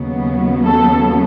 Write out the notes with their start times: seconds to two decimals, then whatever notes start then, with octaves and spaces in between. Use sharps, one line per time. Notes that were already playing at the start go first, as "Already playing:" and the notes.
Already playing: D#2 C#3 F#3 B3
0.66 A4